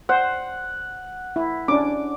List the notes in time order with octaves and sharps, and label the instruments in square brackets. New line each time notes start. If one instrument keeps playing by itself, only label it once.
[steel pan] C5 [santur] F#5
[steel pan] E4
[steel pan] C#4 D4 [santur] D6